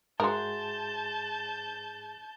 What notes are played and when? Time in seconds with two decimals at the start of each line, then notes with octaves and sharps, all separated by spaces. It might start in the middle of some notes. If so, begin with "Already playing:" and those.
0.20 G#2 F#4 G#4 A#4 E5 A5 C6 G6